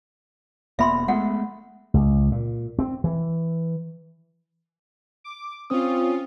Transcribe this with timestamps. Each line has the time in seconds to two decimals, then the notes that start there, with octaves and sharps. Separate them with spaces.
0.79 E1 A#3 B3 E5 B5 C6
1.08 G#3 A3 B3 F#5
1.94 C#2
2.32 A#2
2.79 C4
3.04 E3
5.24 D6
5.70 C4 C#4 F4 C5 D#6